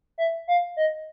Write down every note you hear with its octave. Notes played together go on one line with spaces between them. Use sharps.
E5
F5
D#5